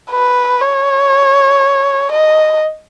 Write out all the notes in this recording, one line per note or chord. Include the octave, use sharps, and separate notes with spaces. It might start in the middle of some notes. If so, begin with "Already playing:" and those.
B4
C#5
D#5